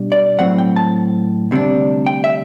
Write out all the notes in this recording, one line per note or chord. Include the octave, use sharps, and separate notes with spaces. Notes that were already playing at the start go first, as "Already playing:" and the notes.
Already playing: B2 G3 D4
D5
A2 F#3 C4 F#5
G5
A5
D2 C3 G3 D4
G5
E5